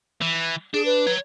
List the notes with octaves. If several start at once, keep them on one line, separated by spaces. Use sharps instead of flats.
E3
D4 G#4
B4
C#5 A#5